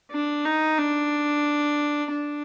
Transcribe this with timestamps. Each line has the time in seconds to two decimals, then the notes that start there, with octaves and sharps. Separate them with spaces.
0.12 D4
0.45 D#4
0.78 D4
2.11 D4